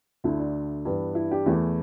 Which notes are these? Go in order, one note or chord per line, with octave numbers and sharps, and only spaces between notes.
D2 D3 A3 E4
D4
G2 E3 B3
E4
D4 G4
E2 E3 A3 E4